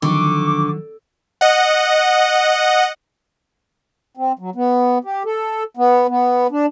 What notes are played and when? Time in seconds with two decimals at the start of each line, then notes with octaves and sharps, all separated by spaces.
0.02 D3 D#3 F3 F#3 C#6 D6
1.41 D#5 F#5
4.17 C4
4.39 F#3
4.55 B3
5.04 G4
5.25 A4
5.77 B3
6.08 B3
6.51 D4